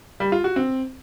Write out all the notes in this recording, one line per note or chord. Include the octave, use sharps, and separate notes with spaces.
G3
F4
F#4
C4